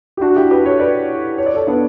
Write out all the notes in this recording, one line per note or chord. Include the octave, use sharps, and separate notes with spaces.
G4
D4 F#4
E4 G4
G4 B4
A4 C#5
B4 D5
C#5
D5
A4 C#5
B3 D4